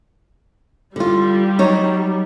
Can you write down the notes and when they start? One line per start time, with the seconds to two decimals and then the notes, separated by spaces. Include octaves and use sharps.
0.96 D3 G3 F4
1.59 F#3 D#4 C#5